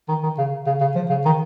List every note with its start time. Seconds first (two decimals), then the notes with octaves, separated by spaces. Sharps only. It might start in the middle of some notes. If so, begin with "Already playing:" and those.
0.09 D#3
0.23 D#3
0.38 C#3
0.66 C#3
0.80 C#3
0.95 F3
1.09 C#3
1.25 D#3